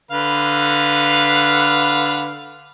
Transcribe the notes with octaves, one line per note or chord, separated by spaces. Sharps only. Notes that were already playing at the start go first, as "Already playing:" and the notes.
D3 B4 F5